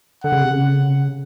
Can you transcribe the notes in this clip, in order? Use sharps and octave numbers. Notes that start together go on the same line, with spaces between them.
D3 F#5
C#3
C3
C#3